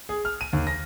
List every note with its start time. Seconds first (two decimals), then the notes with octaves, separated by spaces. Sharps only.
0.09 G#4
0.25 F6
0.41 D#7
0.53 D#2
0.67 A#6